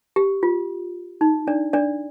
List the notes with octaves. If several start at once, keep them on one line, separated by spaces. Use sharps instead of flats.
G4
F4
D#4
D4 D5
D4 D5